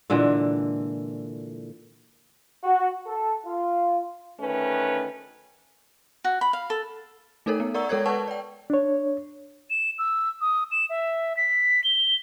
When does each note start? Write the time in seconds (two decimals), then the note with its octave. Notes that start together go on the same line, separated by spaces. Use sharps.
0.10 A#2 D3 E3 G#3
2.63 F#4
3.06 A4
3.46 F4
4.40 D2 D#3 A3 C#4 B4
6.24 F#4
6.41 B5
6.53 F5
6.70 A4
7.46 A3 D#4 A4 A#4 C#5
7.60 B3
7.74 A#4 D5 F#5 A#5 C#6 E6
7.89 G#3 A4 A#4 C#5 G#6
8.06 B4 F#5 A5 C#6
8.28 D5 G5
8.70 D4 C#5
9.70 E7
9.99 E6
10.41 D#6
10.71 E7
10.90 E5
11.37 B6
11.84 G7